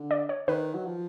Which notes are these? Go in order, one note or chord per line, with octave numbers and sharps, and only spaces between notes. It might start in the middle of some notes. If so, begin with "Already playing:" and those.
Already playing: D3
D5
C#5
D#3 B4
F#3
F3